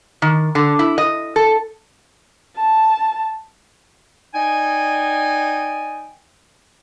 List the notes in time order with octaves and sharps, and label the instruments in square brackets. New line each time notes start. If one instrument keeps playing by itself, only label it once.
[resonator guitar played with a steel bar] D#3
D3
E4
D#5
A4
[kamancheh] A5
[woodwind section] D#4 D5 D#5 G5 G#5